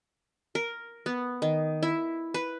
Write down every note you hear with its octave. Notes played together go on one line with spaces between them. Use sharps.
A#4
B3
D#3
E4
B4